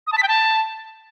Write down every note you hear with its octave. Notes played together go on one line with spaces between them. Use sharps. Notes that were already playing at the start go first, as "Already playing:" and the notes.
D#6
A5
B6
G5
A5